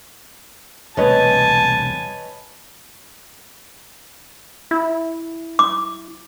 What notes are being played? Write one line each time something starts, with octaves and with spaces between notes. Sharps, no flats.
E1 C2 A3 B4 C#5 D#5 G#5 A5
E4
D6